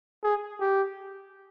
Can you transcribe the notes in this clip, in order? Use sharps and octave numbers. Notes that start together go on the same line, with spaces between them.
G#4
G4